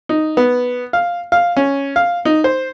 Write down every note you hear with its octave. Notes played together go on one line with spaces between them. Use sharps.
D#4
B3
F5
F5
C#4
F5
D#4
C5